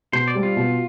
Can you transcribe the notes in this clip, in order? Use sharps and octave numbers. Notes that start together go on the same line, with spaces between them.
B2 C5
D5
G3 C4
F4
B2